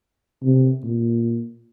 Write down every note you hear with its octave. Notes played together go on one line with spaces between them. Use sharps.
C3
A#2